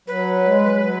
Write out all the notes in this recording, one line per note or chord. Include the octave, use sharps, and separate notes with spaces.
F#3 B4
G#3
G#3
F#3